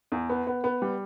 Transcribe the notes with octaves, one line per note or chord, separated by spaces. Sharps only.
E2
B3
B3
B3
G3